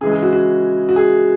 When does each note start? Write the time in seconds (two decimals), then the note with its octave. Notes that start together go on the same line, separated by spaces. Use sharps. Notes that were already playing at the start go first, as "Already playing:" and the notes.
0.01 C#3 E3 G#3 G#4
0.11 G#4
0.22 F#4
0.33 F#4
0.89 F#4
0.96 G#4